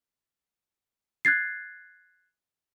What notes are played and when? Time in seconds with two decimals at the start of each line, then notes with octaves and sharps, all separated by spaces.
1.25 F#6 G#6 A6 C7